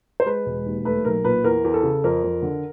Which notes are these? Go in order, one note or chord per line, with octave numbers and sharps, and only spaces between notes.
C5
G#3 B4
E1
D#2
A3 B4
B1 A#4
A#2 B4
E2 A#4
E2
A4
C#3
F2 A#4
F2
D3